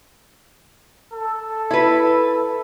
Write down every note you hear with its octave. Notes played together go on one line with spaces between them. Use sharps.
A4
E4 B4